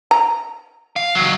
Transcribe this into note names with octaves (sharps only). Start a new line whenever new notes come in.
A#5
F5
D#3 F#3